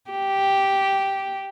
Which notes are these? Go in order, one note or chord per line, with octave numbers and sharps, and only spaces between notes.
G4